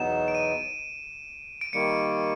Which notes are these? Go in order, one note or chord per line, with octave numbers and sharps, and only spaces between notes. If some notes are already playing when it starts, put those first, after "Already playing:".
Already playing: E2 B2 F#3 B3 D#4 E7
D7
D#7
D7
D#3 G3 A#3 C#7